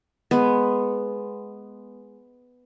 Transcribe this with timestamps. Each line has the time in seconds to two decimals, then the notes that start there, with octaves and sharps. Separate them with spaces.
0.31 G#3 B3